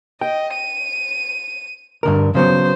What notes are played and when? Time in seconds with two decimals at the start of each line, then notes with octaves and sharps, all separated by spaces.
0.21 D#5 G5
0.53 D#7
2.03 G2 D3 A#4
2.35 C#3 F#3 B3 C5